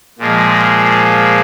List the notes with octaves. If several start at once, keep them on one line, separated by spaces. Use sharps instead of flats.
A#2 F3 G#3